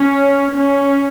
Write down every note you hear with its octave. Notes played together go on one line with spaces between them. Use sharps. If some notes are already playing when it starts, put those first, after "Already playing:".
Already playing: C#4
C#4